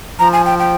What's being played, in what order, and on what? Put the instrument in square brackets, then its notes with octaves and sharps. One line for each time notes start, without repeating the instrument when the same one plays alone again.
[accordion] F3 [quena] A#5
[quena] G#5
G5
G5